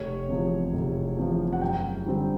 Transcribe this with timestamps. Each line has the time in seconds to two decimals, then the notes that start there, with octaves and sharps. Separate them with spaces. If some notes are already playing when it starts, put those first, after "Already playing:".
Already playing: F1 C#5
0.29 E2 C3 F3
0.73 F1
1.17 E2 C3 F3
1.53 F#5
1.61 F#2 G5
2.06 D3 G3 C4